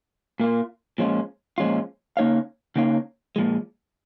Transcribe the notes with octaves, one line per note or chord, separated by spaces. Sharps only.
A#2 A#3 F4
A#2 F3 G#3 C#4 F4
A#2 F3 G#3 C#4 F4
C#3 A#3 D#4 C#5 F5
C#3 A#3 D#4 C#5 F5
A#2 F3 G#3